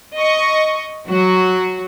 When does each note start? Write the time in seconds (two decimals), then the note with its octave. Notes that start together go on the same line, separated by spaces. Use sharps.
0.17 D#5 C#6
1.07 F#3 F#4